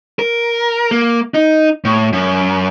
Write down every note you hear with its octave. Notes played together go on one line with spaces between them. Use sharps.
A#4
A#3
D#4
A2
F#2